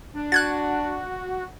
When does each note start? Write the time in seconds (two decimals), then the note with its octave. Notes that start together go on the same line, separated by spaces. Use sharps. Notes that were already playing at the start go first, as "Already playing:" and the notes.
0.15 D4
0.32 F#4 F#6 G#6 A6